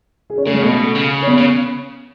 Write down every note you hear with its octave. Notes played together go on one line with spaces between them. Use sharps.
G#4
C#4
C#3 A3
G#3
B2 A3
C#3
C#4
B3
C#3